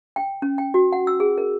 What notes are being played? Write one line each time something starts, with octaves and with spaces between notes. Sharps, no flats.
G5
C#4
G5
F#4
F#5
E6
G#4
A#4